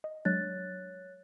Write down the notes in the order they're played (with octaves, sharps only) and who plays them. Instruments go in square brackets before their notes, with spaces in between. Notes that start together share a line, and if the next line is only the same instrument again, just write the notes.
[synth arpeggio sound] D#5
[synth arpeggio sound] F#3 G#3 D4 [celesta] C#5 F#6 A6